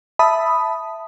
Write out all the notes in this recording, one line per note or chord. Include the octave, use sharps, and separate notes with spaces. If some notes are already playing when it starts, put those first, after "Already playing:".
E5 A5 B5 D#6